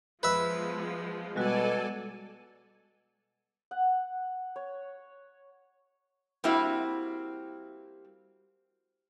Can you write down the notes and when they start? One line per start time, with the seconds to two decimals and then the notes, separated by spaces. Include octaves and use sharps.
0.23 F3 G#3 B3 B4 E5 F#6
1.36 B2 G3 G#3 F#4 A4 D5 G#5
3.71 F#5
4.56 C#5
6.44 G3 A#3 C4 E4 F#4